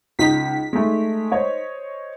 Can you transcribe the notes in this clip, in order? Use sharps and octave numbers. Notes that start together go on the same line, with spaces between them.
C#2 D#4 B6
G#3 A3
C5 C#5 D#5